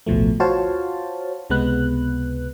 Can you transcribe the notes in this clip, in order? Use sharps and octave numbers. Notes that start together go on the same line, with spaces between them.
A1 D2 B2 F3 A3
F4 F#4 C5 C#5 F5 A5
C#2 C3 G#3 B3 B4 F#6